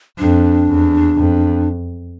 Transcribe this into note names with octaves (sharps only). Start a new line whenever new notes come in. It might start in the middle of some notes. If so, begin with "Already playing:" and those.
F2 D4
E2
F2